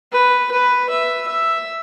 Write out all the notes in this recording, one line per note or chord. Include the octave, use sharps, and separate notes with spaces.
B4
B4
E5
E5